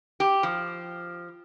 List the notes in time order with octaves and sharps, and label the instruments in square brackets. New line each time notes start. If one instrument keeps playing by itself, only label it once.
[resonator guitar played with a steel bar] G4
F3